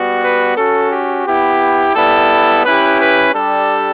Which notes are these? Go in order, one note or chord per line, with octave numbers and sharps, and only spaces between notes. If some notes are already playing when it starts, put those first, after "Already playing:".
Already playing: G3 B3 F#4
B4
C#4 F#4 A4
G4
B3 E4 G4
G3 B3 E4 A4
C#4 E4 G4 B4
B4
G3 D4 G4 A4